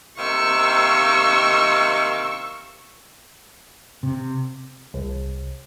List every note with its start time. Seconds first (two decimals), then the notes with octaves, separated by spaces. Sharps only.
0.19 C3 D#3 A#3 C#6 E6
4.03 C3
4.94 C2